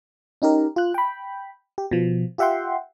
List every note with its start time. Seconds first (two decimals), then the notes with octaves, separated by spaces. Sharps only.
0.42 C#4 D#4 G4 A#4
0.76 F4 F#6
0.94 G5 B5
1.78 G4
1.91 B2 F3
2.38 F4 G4 E5 F#5 G5 C6